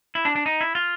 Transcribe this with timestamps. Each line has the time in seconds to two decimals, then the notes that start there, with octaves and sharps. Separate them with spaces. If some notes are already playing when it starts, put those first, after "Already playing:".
0.15 E4
0.25 D4
0.36 D4
0.46 D#4
0.61 E4
0.75 F4